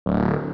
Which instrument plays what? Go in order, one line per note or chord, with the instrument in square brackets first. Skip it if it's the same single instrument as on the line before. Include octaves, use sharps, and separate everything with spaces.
[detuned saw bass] D1